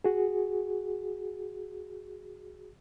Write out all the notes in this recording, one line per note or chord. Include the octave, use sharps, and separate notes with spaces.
F#4 G#4